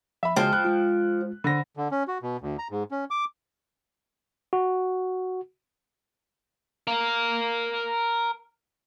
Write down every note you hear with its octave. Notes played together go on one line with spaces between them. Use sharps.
F3 E5 B5
C#3 F3 G#3 F#4 G5 A5
B5 F#6
G#3 F4
D3 C5 B5 A#6
D3
C#4
F#4
B2
D2
A#5
G#2
C#4
D6
F#4
A#4 F5